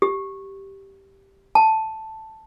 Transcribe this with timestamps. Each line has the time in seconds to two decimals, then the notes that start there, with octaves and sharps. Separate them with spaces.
0.02 G4
1.55 A5